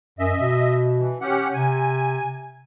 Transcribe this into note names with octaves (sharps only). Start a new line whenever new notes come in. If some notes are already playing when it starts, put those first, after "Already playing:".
F#2 D#5 E5
B2
E3
C#4 G4 F#5
C3 G#5